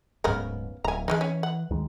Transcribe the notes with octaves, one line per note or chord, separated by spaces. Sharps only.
D1 G#2 C#3 B3 A#4
D1 G#5 A#5
E3 G#3 C#4 D#4
C#4
F#5
D2 D#3 G#3